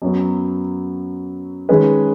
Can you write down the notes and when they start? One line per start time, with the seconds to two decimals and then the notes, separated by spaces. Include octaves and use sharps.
0.02 F#2 F#3 B3
1.69 D#3 G#3 C#4 G#4 B4